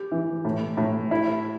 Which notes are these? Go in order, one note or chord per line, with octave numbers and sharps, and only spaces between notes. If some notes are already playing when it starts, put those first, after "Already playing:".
Already playing: G4
E3
A2
A2
E4